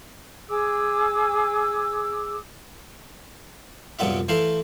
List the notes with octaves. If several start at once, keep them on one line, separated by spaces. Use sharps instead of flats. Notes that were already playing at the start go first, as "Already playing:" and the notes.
G#4 D6 E6
C2 F#2 A#2 B3 F4 E5
E3 A3 E4 C5 F5